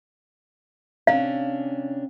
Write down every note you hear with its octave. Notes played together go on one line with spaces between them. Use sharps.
C3 C#4 D4 F5